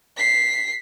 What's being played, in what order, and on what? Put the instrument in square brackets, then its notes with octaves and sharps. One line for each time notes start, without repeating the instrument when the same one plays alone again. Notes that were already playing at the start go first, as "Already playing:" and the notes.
[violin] B6 C7